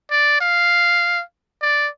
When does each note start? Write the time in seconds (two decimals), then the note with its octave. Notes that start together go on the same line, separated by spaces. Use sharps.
0.11 D5
0.41 F5
1.62 D5